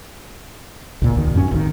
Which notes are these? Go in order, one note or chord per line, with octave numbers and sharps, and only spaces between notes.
C#2 A#2
D#2 D#3
F#2 G3 C#4
G#1 D#3